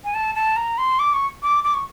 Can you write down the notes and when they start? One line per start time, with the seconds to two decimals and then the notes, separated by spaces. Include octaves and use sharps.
0.04 G#5
0.14 A5
0.35 A5
0.56 A#5
0.78 C6
0.99 D6
1.14 C#6
1.43 D6
1.64 D6
1.74 C#6